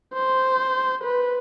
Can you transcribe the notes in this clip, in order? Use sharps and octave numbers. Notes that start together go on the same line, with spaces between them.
C5
B4